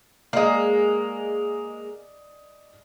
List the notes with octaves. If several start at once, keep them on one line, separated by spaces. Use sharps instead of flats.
G#3 A#3 D5 D#5 D#6